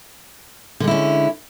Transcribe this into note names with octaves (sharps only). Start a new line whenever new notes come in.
D3 G#3 C#4 E4